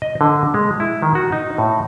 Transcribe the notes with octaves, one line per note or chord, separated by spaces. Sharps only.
D#5
D3
G#3
E4
D#3
F#4
D#4
A2